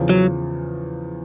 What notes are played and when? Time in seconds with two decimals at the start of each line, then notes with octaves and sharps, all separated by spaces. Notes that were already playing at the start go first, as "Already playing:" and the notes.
Already playing: E2 C#3 F3
0.09 F#3